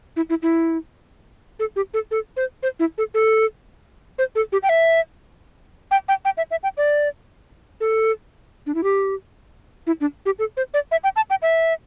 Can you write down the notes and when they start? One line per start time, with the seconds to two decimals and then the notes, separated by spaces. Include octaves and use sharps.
0.16 E4
0.30 E4
0.42 E4
1.59 A4
1.76 G4
1.94 A4
2.11 A4
2.37 C5
2.63 C5
2.79 E4
2.98 A4
3.14 A4
4.18 C5
4.35 A4
4.52 G4
4.63 G5
4.69 E5
5.91 G5
6.08 G5
6.25 G5
6.37 E5
6.51 E5
6.63 G5
6.77 D5
7.81 A4
8.66 D4
8.75 E4
8.83 G4
9.87 E4
10.01 D4
10.26 G4
10.39 A4
10.57 C5
10.74 D5
10.92 E5
11.04 G5
11.16 A5
11.30 G5
11.42 E5